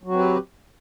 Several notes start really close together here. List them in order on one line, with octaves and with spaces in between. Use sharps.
F#3 F#4 C4 B4 G4